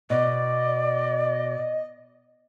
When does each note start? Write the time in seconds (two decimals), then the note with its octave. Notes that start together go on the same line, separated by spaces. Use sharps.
0.10 B2 D5 D#5